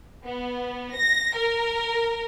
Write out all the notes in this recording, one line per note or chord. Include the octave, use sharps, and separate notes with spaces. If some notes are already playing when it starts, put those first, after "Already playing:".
B3
A#6
A#4